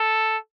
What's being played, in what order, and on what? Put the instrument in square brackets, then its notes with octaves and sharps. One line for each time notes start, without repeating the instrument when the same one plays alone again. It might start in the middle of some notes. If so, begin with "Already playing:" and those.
Already playing: [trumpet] A4